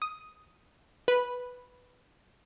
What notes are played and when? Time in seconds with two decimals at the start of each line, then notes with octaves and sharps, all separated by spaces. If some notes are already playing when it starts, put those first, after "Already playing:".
0.02 D#6
1.08 B4